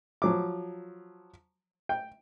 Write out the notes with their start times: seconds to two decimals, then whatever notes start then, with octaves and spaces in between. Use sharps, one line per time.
0.22 F3 F#3 D6
1.89 G5